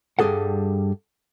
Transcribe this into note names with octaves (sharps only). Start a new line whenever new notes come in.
G2 G3 D4 G#4 A4 F#5